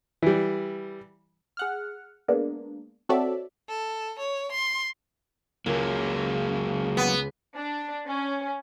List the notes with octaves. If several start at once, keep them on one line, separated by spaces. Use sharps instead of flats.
E3 G3
G#4 F#5 F6
G#3 A#3 B3 D4
C4 F#4 A4 C#5 D5 E5
A4
C#5
C6
C#2 F#3 A#3
B3
D4
C#4